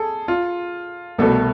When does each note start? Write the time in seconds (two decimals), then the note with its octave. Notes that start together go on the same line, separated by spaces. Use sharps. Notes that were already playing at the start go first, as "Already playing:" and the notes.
Already playing: G#4 A4
0.28 F4
1.18 C2 B2 A3 A4